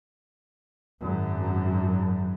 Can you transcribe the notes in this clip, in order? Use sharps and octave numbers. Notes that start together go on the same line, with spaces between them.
G#1 F#2